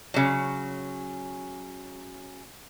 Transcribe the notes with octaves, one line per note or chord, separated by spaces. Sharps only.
C#3 F#3